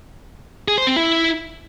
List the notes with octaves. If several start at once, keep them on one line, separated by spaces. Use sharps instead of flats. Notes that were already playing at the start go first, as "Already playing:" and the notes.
G#4
C5
C4
E4